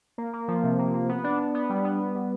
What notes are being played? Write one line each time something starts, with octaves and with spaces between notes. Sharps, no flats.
A#3
A#3
F3
C3
A#3
A#3
B3
D4
D4
B3
G3
B3
G3
G3